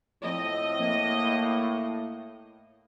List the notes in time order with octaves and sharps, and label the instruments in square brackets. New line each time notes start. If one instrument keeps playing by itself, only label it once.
[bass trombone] A2 [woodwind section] F3 C4 [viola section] D#5
[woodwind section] A#3